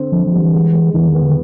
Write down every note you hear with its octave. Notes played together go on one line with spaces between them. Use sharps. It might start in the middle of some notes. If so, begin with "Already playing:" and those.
Already playing: D3 C4
D3 F3
F3
G3
E3
G#3
G#3
E2 E3
D#3
B3
D3